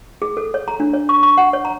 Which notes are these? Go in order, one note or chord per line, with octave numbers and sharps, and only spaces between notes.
G#4
A4
C#5
A#5
D4
C#5
C#6
C#6
F#5
C#5
A#5